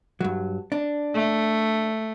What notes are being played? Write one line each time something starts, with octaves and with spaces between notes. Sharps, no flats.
G2 F#3
D4
A3